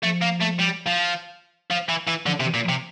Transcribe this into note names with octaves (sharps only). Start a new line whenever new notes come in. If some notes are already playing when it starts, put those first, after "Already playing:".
F3 A3
A#3
A3
G3
F3
F3
E3
E3
D3 F3
C3
E3
A#2
F3
C3